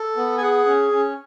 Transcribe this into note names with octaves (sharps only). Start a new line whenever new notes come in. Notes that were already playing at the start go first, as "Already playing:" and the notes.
Already playing: A4
B3
G#5
G#4 F#5
C#4
C#4